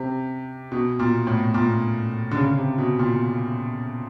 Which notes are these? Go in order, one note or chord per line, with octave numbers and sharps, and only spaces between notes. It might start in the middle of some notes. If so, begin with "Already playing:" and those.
Already playing: C3
B2
A#2
A2
A#2
D3
C#3
C3
B2
A#2